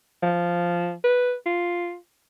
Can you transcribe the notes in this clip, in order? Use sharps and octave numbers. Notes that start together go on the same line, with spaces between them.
F3
B4
F4